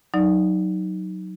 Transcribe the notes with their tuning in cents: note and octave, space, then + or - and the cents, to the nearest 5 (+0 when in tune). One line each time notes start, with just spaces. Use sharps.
F#3 +0 D#4 +0 D5 +5